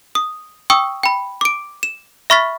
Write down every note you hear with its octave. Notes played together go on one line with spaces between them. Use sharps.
D#6
G5 C#6 D#6 E6
G5 B5
D6 D7
E7
E5 B5 C#6 F6 A6 B6